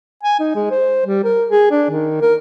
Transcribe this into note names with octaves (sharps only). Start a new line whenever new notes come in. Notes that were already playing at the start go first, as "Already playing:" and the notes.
G#5
D#4
G#3
C5
G3
A#4
G#4
D4
D#3
A#4